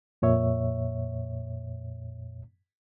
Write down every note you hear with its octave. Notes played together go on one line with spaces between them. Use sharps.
F2 A#2 C#5 E5